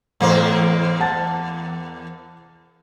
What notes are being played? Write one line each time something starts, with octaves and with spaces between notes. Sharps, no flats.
E2 A2 A#3 C5
F#5 A5 A6